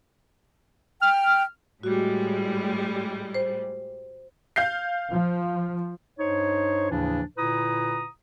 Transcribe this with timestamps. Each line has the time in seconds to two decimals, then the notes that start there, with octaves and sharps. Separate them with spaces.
1.01 G5 F6
1.83 A2 G3 G#3 F#4
3.35 C5
4.56 F5 G6 C7
5.12 F3
6.19 G2 D#4 C5 C#5
6.91 D#2 A2 C#3 E3 F3 D4
7.38 A#2 D3 E4 B4 A#5 D#6